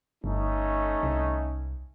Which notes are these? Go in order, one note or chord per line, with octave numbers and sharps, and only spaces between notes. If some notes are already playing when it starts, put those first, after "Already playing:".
G1 A3 C#4 D#4
C2